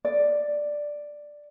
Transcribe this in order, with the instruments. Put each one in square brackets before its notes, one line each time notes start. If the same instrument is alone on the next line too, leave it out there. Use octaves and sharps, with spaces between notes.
[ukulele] D5